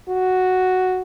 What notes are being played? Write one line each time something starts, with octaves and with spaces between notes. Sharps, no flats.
F#4